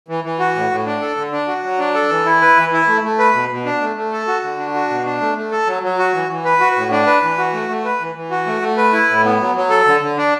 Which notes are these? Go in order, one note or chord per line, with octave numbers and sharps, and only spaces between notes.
E3
E3
F#4
A2
A2
D4
A4
D3
D4
F#4
F#3
D4
A4
E3
E4
B4
E3
E4
A3
A3
B4
B2
B2
D4
A3
A3
A4
F#4
D3
D4
F#4
B2
D4
A3
A3
A4
F#3
F#3
F#4
E3
E3
B4
F#4
A2
D4
B4
E3
F#4
A3
A3
B4
E3
E3
F#4
A3
A3
B4
E4
A2
B3
F#3
F#3
A4
D3
D3
D4